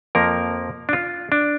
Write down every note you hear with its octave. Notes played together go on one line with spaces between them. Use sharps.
F2 F3 A#3 A#4
D4
F4
D4